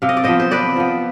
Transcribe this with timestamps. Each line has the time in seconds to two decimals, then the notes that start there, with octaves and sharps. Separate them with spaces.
0.02 C3 F5
0.09 D#5
0.17 D5
0.24 F3 B3 C5 D#5
0.40 C5
0.51 C3 B4 D5
0.77 F3 B3